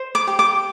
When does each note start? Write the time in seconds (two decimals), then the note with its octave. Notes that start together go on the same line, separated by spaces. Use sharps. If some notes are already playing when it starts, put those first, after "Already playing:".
Already playing: C5
0.15 D6
0.27 G4
0.39 D6